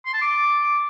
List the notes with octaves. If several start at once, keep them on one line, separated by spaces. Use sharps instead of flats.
C6
A5
D6